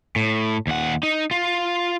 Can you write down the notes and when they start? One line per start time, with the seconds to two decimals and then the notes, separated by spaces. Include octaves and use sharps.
0.16 A2
0.67 D#2 F#5
1.03 D#4
1.31 F4